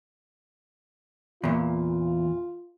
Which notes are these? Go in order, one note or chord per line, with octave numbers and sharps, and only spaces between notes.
E2 A#2 F4